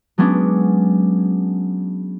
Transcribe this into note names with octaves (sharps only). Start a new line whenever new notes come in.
F#3 G#3 B3 C#4 D4